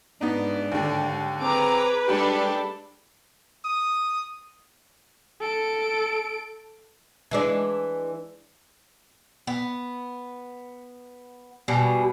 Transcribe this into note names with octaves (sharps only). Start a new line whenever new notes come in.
G#2 B3 D4 D#4
D#2 D3
C4 G#4 B4 A#5 D6
G3 G#3 D4 G4 A4 B5
D#6
A4 D7
E3 G#3 D4
B3
B2 G3 G#4